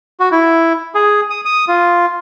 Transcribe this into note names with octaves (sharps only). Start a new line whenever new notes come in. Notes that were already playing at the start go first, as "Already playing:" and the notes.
F#4
E4
G#4
D#6
D#6
F4